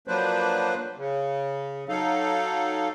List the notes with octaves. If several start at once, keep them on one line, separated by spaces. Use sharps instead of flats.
F3 F#3 A#3 D4 B4 C5
C#3
F#3 D#4 A4 F5